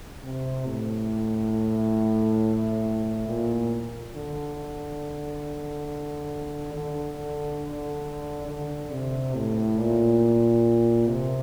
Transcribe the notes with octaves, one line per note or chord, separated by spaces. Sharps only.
C3
A2
A#2
D3
D3
D3
C3
A2
A#2
C3